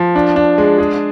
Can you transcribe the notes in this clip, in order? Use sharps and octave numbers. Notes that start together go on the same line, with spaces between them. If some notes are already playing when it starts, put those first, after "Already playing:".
Already playing: F3
D4
D4
G#3
G#4